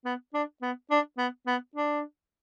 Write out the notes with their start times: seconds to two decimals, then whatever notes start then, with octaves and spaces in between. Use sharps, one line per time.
0.05 B3
0.34 D4
0.62 B3
0.90 D4
1.18 B3
1.47 B3
1.75 D4